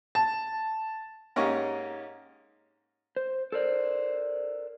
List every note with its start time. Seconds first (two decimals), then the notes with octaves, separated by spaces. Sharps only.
0.15 A5
1.36 G#2 A#3 C#4 G4 D#5 C#6
3.16 C5
3.52 A4 A#4 C5 D5